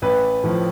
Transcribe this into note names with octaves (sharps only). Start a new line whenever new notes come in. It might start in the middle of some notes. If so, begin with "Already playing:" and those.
A1 B4
A2 F3